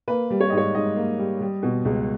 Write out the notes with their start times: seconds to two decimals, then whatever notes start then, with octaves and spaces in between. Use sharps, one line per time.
0.08 A#3 B4
0.30 G3
0.40 C#5
0.50 G#2 D#5
0.57 C#5
0.75 G#2 D#5
0.96 A#3
1.18 G3
1.41 G3
1.63 B2
1.85 C#2